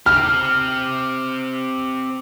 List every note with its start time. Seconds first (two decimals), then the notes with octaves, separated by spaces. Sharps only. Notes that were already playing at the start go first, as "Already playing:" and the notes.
0.06 C4 G4 F6